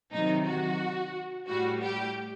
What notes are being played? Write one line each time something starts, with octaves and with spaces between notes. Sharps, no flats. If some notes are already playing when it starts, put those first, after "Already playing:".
C3 D#3 F#3 D#4
F#4
A2 G3 F#4
G4